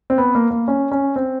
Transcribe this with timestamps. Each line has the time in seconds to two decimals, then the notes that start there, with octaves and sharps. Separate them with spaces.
0.10 C4
0.18 B3
0.35 A#3
0.51 A#3
0.68 C#4
0.91 C#4
1.16 C4